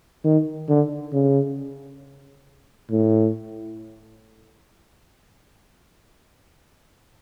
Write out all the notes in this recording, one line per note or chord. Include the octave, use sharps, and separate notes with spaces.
D#3
D3
C#3
A2